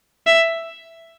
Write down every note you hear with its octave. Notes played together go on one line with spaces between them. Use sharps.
E5